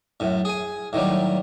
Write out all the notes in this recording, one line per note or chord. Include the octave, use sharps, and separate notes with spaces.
F#2 A2
G#4 G#5
A2 D#3 F#3 G3